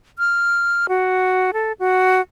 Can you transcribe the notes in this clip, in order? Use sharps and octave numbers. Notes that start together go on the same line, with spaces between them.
F6
F#4
A4
F#4